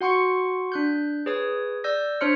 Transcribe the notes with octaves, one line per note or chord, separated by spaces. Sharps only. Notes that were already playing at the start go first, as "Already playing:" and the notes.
F#4 F#5 C6 C#6 C#7
D4 F#6 G6
G#4 B4 C#5 D#6
D5 E6 G6 A#6
D4 C5 C#5 C6 F6 C#7